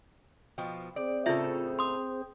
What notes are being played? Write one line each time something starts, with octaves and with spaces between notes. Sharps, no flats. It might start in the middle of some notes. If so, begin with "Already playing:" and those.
B2 F3 G5
C4 G#4 C5 D5
A2 C#3 F4 A4 E5
C6 D#6